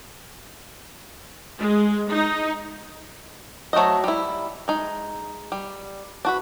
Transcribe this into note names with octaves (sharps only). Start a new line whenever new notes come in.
G#3
D#4
F#3 A3 F#4 C5 D#5
G3 E4
G#3 D#4
G3
D4 F#4 B4